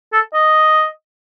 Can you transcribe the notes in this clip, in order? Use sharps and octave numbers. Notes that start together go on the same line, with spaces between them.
A4
D#5